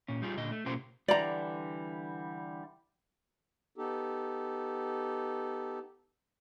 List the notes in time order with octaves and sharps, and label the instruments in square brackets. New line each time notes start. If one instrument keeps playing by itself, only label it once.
[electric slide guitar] A#2 C#4
G3 D#4 F4 G#4
A#2 D3 D#5
A3
B2 A#3 C#4 F4 G4 C5
[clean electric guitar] D3 E3 G3 [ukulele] D5 A#5
[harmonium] B3 D#4 G4 A4